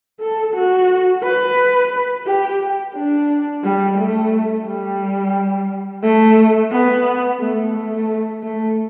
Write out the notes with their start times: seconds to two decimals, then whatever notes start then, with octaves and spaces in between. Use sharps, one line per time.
0.20 A4
0.55 F#4
1.24 B4
2.26 G4
2.95 D4
3.64 G3
3.98 A3
4.66 G3
6.03 A3
6.72 B3
7.40 A3
7.75 A3
8.43 A3